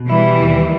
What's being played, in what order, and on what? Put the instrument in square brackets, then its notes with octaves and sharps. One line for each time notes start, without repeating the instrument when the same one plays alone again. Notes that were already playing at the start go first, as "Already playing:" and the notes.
Already playing: [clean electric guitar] B2
[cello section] E3 G3 [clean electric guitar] E4
[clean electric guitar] D#2